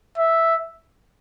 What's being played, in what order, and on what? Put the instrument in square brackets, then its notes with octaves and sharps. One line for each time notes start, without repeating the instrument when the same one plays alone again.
[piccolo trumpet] E5